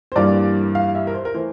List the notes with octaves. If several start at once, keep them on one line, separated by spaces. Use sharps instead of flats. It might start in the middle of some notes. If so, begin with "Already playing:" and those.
C5
G2 E3 G3 A#3 D5
F5
E5
A#4
C5
A#4
E3 A3 C5